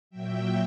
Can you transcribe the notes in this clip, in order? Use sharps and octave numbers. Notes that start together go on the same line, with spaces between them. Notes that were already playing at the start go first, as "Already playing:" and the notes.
A#2 F#3 E5 G5